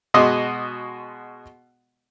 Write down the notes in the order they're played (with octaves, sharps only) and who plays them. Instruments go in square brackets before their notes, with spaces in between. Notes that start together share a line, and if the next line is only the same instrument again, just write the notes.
[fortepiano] B2 G#3 F#4 D#5 C6 D6